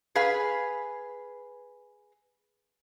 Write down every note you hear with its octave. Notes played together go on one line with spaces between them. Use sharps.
G#4 B4 F5